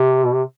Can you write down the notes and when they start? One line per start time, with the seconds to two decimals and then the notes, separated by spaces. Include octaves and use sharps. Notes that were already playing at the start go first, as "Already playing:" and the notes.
Already playing: C3
0.25 B2
0.34 C3